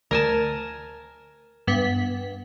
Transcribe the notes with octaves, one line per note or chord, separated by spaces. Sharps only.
D2 A#4 G#5 A5
G2 B3 B6